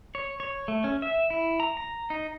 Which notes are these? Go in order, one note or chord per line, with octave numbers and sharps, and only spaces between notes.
C#5
C#5
A3
C#4
E5
E4
A#5
A#5
D#4